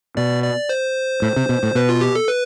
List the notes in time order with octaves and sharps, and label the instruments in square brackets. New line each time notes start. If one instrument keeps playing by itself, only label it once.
[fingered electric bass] B2 [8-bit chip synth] D5
[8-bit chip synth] D5
C5
[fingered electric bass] A2
C3
B2
A2
[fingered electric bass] B2 [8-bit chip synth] B4
[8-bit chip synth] F4
G4
A4
B4